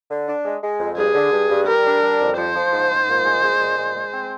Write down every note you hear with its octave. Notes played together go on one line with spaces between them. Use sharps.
D3
D4
G#3
G#3
F2
G2 G#4
D3
G2
G2
G3 A#4
D4
G3
F2
F3 C5
F3
G#2
G#2
A#2
G#3
G#3
A#2
G#3
G#3
C4